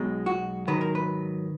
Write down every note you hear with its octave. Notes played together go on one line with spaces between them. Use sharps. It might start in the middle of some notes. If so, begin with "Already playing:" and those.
Already playing: B1 B2 G#3
F#4
G#2 D#3 F#3 B4
A#4
B4